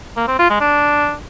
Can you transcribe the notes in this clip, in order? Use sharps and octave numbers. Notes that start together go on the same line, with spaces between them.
A#3
C4
F4
G#3
D4